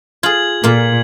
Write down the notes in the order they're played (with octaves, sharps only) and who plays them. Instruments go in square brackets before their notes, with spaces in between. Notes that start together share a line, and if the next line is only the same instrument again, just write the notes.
[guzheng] F4 G#4 [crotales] G#6 F#7
[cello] A#2 [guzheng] A#3 F4